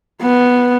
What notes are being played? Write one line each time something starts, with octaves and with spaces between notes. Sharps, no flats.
B3